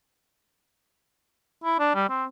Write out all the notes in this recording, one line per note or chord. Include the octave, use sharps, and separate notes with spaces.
E4
D4
G3
C4